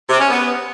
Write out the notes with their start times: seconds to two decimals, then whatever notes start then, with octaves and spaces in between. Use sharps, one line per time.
0.09 C3
0.20 C#4
0.30 B3